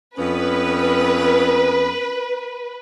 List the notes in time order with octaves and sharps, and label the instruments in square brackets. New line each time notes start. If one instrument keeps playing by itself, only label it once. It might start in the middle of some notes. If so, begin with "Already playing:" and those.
[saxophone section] F2 B3 C#4 [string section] B4